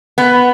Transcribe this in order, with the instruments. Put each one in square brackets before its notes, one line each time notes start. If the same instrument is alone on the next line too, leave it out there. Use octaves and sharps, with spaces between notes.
[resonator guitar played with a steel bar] B3